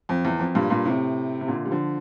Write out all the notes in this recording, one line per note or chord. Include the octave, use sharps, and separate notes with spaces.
F2
E2
F2
G2 A#2
G2 A#2
A2 C3
C3
A#2 D3
G3
D3 F3